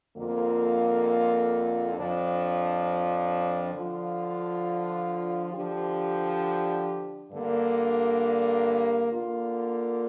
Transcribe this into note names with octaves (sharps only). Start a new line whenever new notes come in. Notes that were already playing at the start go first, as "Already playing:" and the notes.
F2 D3 A#3 F4
F2 F3 D4
D3 F3 D4 F4
D3 F3 D4 G4
G2 D3 A#3
D3 A#3 F4